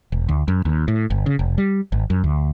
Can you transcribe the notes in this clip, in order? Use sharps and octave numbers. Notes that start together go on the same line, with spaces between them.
E1
D2
F#2
D#2
A2
G1
C#3
F1
G3
G#1
F#2
D2